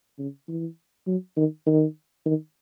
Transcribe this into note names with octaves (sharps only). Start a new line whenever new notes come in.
C#3
E3
F#3
D#3
D#3
D#3